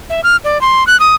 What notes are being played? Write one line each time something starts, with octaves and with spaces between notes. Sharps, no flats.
E5
F6
D5
C6
F#6
D#6